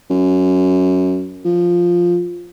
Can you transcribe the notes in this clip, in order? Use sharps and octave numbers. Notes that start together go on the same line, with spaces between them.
F#2
F3